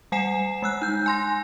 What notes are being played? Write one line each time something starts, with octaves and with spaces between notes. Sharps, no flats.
G3 F#5 G#5 C7 E7
G#3 E6 F#6
D#4 G6
G#5 C6 A#6